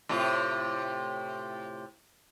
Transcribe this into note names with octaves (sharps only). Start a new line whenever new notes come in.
A2 C3 F4